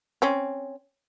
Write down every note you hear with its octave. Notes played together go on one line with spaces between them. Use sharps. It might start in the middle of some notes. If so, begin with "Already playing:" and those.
C4 C#4